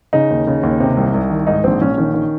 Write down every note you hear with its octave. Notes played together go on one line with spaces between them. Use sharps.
C#3 D#4
D#2
C#3
D#2
C3
C2
C2
D#3
G#2 D#4
A#1 C4
A#1 C#4
D#3 C#4
D#3